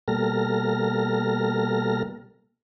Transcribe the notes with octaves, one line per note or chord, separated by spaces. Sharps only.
B2 G3 A#3 A4 F6 A#6